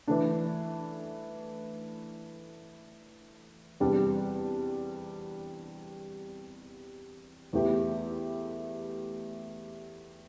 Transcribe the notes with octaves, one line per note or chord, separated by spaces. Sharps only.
E3 A3 D4
E2 C3 G3 D4
E2 E3 A3 E4 G4